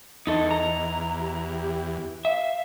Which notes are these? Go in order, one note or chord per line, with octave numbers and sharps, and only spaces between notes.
E2 D#4 E4 A4 D#5
A#5
G4
E5 F5